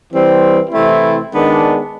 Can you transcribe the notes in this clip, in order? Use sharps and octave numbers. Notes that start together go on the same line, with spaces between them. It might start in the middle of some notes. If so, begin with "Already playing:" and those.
E3 G3 C4
C3 E3 A3 C4 E4
D#3 G#3 B3 D4